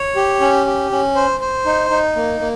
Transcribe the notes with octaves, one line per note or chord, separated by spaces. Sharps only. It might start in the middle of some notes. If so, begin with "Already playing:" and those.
Already playing: C#5
G4
C#4
G4
C#4
C5
C5
D#4
D#4
A#3
A#3